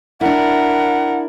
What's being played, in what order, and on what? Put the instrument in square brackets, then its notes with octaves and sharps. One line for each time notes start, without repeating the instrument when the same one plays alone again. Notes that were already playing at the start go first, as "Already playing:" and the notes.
[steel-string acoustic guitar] D4 E4 [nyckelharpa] A#4 [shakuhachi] F#5